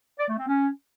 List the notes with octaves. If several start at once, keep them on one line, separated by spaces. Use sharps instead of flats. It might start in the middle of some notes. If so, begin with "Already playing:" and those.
D5
A3
C4
C#4